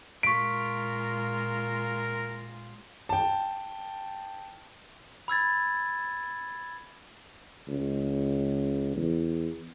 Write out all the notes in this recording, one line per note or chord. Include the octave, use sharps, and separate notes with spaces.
A#2 G#3 F4 A#4 C#6 B6 D7
G5 A5
B5 E6 G#6 A6
C#2
E2